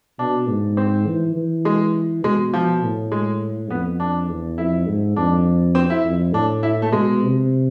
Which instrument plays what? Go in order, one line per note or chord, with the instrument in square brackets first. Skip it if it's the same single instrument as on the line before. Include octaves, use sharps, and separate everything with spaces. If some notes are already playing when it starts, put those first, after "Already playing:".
[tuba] B2 [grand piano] D4
[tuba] G#2
[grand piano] C4
[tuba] E3
E3
[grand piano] G#3
[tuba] B2 [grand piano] G#3
[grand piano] F3
[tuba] A2
[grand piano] G#3
[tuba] F2 [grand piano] B3
[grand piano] D4
[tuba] E2
[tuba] F2 [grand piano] E4
[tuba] G#2
[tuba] F2 [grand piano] D4
[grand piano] C4
E4
[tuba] F2
[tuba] A2 [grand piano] D4
[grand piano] E4
A3
[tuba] B2 [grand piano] G#3
[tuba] C3